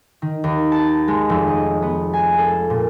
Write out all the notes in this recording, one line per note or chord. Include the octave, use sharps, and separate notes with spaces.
D#3
D#2
A5
G#3
F1
D#5
B3
G#5
A4
A#2